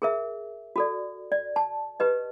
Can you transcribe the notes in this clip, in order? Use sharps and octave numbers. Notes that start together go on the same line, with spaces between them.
G#4 A#4 E5
F#4 A4 D5
D5
A5
G4 B4 D#5